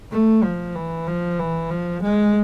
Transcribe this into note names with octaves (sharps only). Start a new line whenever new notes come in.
A3
F3
E3
F3
E3
F3
G#3